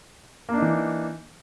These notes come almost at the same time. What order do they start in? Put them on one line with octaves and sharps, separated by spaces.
A#3 D4 D#4 E3